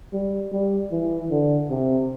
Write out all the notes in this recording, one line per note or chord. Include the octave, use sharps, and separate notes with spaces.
G3
G3
E3
D3
C3